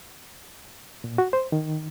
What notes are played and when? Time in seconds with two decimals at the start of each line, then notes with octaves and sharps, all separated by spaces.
1.04 A#2
1.18 F#4
1.33 C5
1.52 D#3